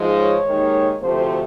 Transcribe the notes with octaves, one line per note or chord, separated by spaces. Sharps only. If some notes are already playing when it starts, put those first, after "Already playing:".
Already playing: G#2 F3 G#3
C#5
D#2 D#3 G#3
D2 C3 F3 A3 C5